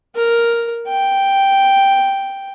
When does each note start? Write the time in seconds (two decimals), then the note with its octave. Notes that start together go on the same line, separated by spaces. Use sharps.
0.15 A#4
0.89 G5